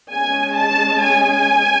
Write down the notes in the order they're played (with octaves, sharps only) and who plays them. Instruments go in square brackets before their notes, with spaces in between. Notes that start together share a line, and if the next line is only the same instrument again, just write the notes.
[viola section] G#3 C#4 G#5
A5
G#5